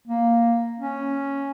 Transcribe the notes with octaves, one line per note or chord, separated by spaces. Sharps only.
A#3
C#4